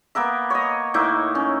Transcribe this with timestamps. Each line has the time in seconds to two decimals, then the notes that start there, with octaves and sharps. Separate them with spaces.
0.15 A#3 B3 A#4 E5
0.50 C#5 D#5
0.94 A2 A#3 D#4 E5
1.35 C#4